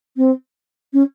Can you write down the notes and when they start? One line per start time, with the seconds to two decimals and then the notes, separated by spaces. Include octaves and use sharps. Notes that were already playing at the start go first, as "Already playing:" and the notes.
0.17 C4
0.93 C#4